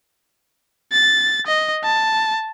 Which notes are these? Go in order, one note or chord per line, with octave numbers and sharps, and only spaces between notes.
A6
D#5
A5